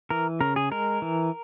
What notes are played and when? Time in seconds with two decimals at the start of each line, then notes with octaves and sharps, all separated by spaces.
0.10 E3 A#4
0.41 C#3 A#4
0.56 G#4
0.71 G#3 A#4
1.02 E3